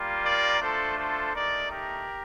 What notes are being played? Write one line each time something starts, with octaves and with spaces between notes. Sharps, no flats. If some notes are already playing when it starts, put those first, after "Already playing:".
Already playing: G3 A#3 F4
A#4 D5
A3 D4 F4 A4 C5
A4 C5
A3 D#4 G4 A#4 D5
G4 A#4